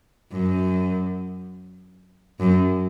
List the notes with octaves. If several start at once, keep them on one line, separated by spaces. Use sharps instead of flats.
F#2
F#2